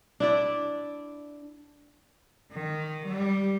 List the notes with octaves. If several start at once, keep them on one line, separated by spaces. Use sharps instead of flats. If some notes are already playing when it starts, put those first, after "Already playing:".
D4 E4 D5
D#3
G3